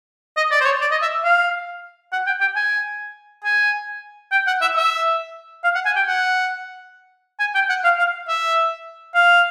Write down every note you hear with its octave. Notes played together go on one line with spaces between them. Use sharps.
D#5
D5
C5
C#5
D5
D#5
E5
F5
F#5
G5
G5
G#5
G#5
G5
F#5
E5
E5
F5
F#5
G#5
G5
F#5
G#5
G5
F#5
F5
F5
E5
F5